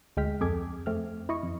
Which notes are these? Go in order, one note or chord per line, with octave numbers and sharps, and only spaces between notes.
D2 G#3 G5 F6 B6
F2 G#4 A4 D6 G#6
F2 A3 C4 F6
E4 D#5 C#6
F2